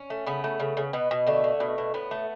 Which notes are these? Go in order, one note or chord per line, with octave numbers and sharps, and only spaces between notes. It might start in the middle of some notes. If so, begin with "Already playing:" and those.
Already playing: C#4
A3
C#3 B3
A3
C#3
C#3
B2 B3
B2
D3 A3
D3
B2
B2
A2 B3
A3